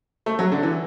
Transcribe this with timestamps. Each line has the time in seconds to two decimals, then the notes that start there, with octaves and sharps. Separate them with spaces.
0.26 A3
0.39 F#3
0.52 D3
0.63 E3